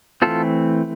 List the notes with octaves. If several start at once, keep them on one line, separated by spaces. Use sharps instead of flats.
E3 A3 C4 F4 A4